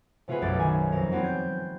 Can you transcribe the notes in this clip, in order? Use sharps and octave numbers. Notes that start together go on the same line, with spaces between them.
C3 A3 F4 F#4 G#4 B4
B1 F#2 D6 A6
D#3 G#5
F2 A#4
F#3 G3 B3 C4 F4 G4
G6 G#6